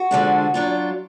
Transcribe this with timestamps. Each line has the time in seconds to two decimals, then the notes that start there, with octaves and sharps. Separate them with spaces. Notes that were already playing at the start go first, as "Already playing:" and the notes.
Already playing: F#4
0.11 D3 F3 G#3 D4
0.54 F#3 D4 F4